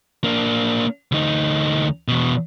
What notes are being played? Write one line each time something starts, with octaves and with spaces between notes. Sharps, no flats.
A#3 D4
D2 D#4
E2 B2